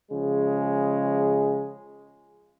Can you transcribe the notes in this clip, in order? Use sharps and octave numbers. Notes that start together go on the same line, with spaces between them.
C#3 F3 G#3 G#4